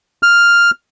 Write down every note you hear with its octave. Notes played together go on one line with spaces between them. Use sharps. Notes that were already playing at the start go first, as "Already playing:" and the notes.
F6